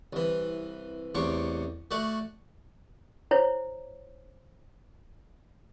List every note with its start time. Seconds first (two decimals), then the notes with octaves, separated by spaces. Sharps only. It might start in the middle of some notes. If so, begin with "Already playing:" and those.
0.13 C2 E3
1.15 A1 E2 C3 C#6 D6
1.91 A3 F#4 D5
3.31 E4 C5 C#5